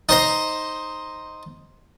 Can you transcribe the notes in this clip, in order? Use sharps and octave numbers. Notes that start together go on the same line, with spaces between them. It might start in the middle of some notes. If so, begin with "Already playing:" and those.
D#4 C5 A#5